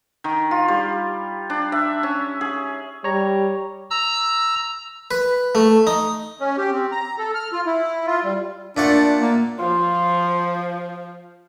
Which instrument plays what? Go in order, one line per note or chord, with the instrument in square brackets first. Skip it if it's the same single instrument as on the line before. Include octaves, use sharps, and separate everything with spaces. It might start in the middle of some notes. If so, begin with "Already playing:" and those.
[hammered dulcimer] D#3
F4
G3
D4
E5
C#4
G#4
[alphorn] G3 [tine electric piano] C#5 A#5
[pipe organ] A#5 E6
[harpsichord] B4
A3
D#4
[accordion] C#4
G4
C4
A#5
A4
F6
F4
E4
F4
G3
[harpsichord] A#2 A3 F#5 [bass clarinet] D4
[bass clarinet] A#3
[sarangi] F3 [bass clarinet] F4